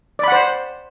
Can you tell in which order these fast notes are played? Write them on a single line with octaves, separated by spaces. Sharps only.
D5 B5 F#5 C5